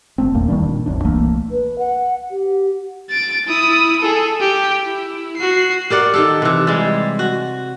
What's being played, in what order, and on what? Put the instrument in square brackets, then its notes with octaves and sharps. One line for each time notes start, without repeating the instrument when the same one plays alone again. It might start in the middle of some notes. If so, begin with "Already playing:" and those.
[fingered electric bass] F#1 A3 C4
D1 E2 A#2 A#3
D#3 F#3 G3 D4
A#2
D1 B1 F#2 D4
C2 E3 A3 A#3
[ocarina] B4
F#5
G4
[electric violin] A6 D7
E4 D#6
G#4 A4
G4
E4
F#4 C7
[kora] G4 A#4 D5 F#5
D#3 G4 A4
C3 E3
G3 G#3
F#4